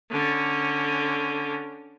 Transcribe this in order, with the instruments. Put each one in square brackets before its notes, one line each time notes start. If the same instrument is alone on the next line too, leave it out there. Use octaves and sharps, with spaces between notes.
[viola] D3 C#4